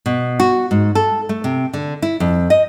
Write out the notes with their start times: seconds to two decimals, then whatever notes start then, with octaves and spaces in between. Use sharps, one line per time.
0.06 B2
0.40 F#4
0.71 G#2
0.95 A4
1.29 A3
1.44 C3
1.74 D3
2.02 E4
2.20 F2
2.50 D#5